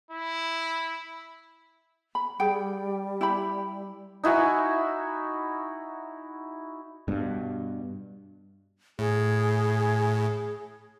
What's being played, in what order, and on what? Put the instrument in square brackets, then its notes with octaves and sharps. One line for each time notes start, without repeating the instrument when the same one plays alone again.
[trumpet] E4
[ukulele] B5
[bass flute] G3 [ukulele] G#4 G5
[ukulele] E4 G4 B5
[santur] D#4 E4 F#4 G#5
[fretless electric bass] G2 B2
[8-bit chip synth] A2 [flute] G#4